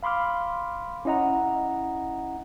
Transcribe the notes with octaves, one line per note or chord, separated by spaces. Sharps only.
F5 B5 C6 D6 F6
C#4 E4 D#5 F#5 A#5